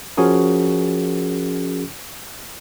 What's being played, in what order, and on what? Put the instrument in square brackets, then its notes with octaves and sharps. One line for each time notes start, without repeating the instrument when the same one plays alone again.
[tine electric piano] F3 C#4 F#4 G#4 A#4